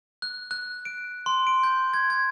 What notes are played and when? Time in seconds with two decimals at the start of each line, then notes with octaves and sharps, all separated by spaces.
0.22 F#6
0.51 F#6
0.85 D7
1.26 C6
1.47 D7
1.63 G6
1.94 G#6
2.10 G#6